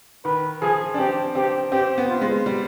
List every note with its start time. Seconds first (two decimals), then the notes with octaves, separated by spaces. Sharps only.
0.25 D#3 B4
0.62 F3 G#4
0.94 D4
0.98 C4 G4
1.35 C4 G4
1.72 C4 G4
1.98 B3
2.09 F4
2.21 G#3
2.46 G3